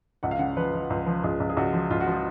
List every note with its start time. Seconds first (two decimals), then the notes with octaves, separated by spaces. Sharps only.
0.23 C#2 F#5
0.31 F5
0.39 C#3 F#5
0.57 F3 B4
0.73 F3
0.90 C#2
1.06 F3
1.23 C#2 G#4
1.40 C#2
1.50 G#4
1.57 C#2 F#4
1.73 F3
1.91 C#2 F4
2.00 F#4
2.07 F3 F4